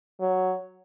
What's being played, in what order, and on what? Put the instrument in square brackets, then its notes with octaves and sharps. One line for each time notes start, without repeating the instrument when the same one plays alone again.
[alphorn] F#3